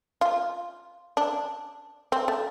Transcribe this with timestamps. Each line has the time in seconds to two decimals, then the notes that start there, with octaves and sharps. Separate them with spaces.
0.21 F4
1.17 D4
2.12 C4
2.28 A3